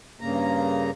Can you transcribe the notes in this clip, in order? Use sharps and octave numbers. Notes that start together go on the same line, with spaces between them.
G2 C#3 A#3 A#5